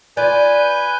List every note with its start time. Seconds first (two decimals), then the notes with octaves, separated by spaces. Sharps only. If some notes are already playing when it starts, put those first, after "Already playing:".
0.17 F4 B4 D5 G#5 G6